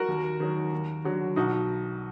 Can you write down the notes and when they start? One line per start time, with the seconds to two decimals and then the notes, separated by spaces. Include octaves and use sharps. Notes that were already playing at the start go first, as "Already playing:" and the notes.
Already playing: F#4 A#4
0.08 D#2
0.40 D#3 F#3
0.73 D#2
1.04 D3 F#3
1.36 B1 D#4 F#4